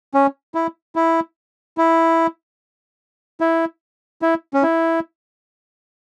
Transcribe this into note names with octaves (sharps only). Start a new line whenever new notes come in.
C#4
E4
E4
E4
E4
E4
C#4
E4